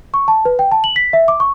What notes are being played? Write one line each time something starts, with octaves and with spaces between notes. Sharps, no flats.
C#6
A5
B4
G5
A5
F#7
B6
E5
D6
C#6